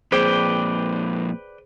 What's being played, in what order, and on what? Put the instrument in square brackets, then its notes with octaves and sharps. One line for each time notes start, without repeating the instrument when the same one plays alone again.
[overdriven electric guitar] F2 A#2 [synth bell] G#4 C5 [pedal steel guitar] B4 D5 G5